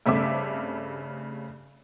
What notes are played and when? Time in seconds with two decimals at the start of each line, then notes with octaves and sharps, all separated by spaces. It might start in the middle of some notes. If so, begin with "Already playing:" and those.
0.06 G2 C#3 A3 C4 E5 D6